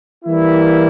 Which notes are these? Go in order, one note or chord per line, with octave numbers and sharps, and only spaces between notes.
E3 G3 A#3 E4